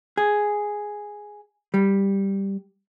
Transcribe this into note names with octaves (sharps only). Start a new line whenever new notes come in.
G#4
G3